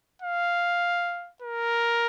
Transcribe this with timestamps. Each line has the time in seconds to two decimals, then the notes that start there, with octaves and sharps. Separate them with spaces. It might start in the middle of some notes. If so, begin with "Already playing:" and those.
0.22 F5
1.42 A#4